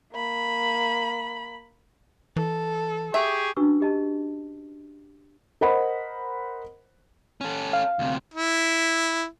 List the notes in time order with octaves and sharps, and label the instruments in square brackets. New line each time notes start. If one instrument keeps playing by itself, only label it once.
[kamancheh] A#3 B5
[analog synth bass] E3 [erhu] A4
[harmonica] G4 G#4 C#6 [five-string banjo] E5
[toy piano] C#4 D4 F#4 B4 C#6 E6
G4 D#5 A5
[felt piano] A#4 C5 D#5 F#5 B5
[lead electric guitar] C#4 A4
[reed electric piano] F5
[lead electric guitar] D2 C3
[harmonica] E4